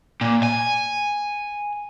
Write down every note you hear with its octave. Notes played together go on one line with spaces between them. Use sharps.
A#2
G#5